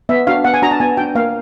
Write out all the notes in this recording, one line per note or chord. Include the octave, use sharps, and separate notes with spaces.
B3 E5
D4 F#4 F5
B3 F#5
G#5
D4 F#4 A#5
A5
B3 G#5
D4 F#4 G5
A#3 F5